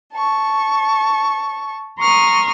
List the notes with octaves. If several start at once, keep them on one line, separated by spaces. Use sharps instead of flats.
A5 C#6
A#5 C6 C#6 D#6 F6